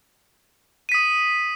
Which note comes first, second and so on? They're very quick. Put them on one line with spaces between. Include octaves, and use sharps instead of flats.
D#7 B6 D#6